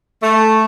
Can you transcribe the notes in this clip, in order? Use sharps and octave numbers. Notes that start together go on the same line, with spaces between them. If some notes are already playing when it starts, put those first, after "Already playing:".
A3